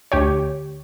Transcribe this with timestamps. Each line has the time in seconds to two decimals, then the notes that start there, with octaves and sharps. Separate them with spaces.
0.12 D2 G4 C#5